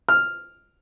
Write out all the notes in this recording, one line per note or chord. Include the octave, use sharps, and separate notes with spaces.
F6